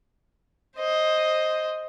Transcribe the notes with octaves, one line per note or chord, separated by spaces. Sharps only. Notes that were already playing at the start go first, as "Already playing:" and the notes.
C5 D#5